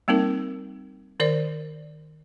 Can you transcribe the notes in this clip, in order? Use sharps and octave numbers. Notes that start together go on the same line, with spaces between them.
G3 A#3 C4 D#4 A#4
D#3 A#4 C5 D5